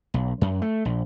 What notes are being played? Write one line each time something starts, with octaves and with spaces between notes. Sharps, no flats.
B1
F#2
A3
A#1